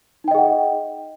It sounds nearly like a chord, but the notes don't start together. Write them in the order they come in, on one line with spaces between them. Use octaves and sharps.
D#4 G5 D#5 G#4 F#5